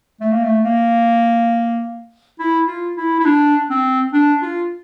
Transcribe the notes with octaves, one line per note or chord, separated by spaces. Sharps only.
A3
A#3
A3
A#3
E4
F4
E4
E4
D4
C4
D4
F4